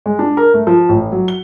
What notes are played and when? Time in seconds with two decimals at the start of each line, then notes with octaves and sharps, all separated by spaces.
0.06 G#3
0.19 D4
0.37 A#4
0.54 A3
0.67 F3
0.89 A1
1.12 F#3
1.28 G7